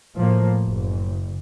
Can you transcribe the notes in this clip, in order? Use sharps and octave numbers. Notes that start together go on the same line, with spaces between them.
A2 F3 A#3
F#1